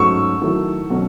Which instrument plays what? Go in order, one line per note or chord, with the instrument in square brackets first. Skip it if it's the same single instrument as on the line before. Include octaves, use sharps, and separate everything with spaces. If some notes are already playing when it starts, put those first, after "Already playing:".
Already playing: [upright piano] G#2 F#3 A3 C#4 [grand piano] C#6 E6
[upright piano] D#3 F#3 A3 E4
B2 F#3 A3 C#4